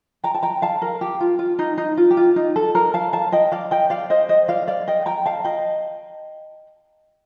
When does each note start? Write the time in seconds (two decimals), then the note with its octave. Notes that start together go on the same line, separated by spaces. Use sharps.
0.24 G5 A#5
0.34 A5
0.43 G5 A#5
0.62 F5 A5
0.82 A#4
1.01 G4
1.20 F4
1.39 F4
1.59 D#4
1.78 D#4
1.97 F4
2.11 G4
2.17 F4
2.36 D#4
2.56 A4
2.75 A#4
2.94 F5 A5
3.13 F5 A5
3.32 D#5 G5
3.52 D5 F5
3.71 D#5 G5
3.90 D5 F5
4.10 C5 D#5
4.29 C5 D#5
4.48 D5 F5
4.67 D5 F5
4.88 D#5 G5
5.06 G5 A#5
5.26 F5 A5
5.44 D#5 G5